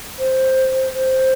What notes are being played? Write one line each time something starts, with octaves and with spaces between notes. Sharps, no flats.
C5
C5